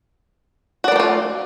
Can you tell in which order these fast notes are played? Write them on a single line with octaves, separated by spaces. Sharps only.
F#4 D5 A#3 A3 F4